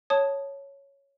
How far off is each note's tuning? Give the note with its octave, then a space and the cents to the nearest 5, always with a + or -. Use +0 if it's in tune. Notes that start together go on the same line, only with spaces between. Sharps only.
C#5 +0 A5 +0 D#6 +0